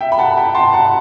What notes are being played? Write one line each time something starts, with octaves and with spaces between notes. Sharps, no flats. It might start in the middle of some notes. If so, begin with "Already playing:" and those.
E5 G5
B5
F#5 A5
G5 B5
A5 C6
F#5 A5